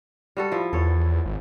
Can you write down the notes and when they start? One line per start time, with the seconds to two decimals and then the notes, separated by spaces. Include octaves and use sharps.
0.37 G3 F#4 A4
0.52 F3 E4
0.73 E2 A4 C#5
1.26 G#1